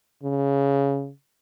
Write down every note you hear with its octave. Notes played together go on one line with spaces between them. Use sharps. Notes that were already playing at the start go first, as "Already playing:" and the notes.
C#3